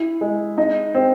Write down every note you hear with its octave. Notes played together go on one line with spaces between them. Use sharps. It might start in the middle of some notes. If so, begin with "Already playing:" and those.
Already playing: E4
G#3
D#4
C4